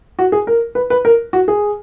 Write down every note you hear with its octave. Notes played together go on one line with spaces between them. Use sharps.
F#4
G#4
A#4
B4
B4
A#4
F#4
G#4